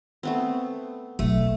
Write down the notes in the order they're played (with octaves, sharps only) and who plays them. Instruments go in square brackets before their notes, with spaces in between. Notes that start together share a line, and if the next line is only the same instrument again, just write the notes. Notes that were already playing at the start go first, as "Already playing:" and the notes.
[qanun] A3 B3 C4
[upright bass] B1 F#3 [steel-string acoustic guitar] A3